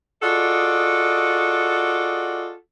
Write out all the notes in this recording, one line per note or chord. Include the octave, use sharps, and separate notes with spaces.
F4 F#4 G#4 A4 D5 D#5